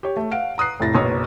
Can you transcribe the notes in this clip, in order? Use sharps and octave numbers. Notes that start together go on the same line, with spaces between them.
G4 C#5
A3
F5 F#5 D7
A#5 D#6 F#6 C7
F1 A2 A6 A#6
F#1 B1 B3 C#5 D#6